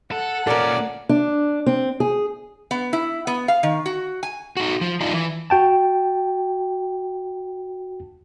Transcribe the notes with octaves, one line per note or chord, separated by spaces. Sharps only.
A4 F#5
A#2 C#4 A4 A#4 D5
D4
C4
G#4
B3
E4
B3
F5
D#3
F#4
G#5
D#4 F#4
F3
D4 D#4 F4
E3
F#4 G5 A5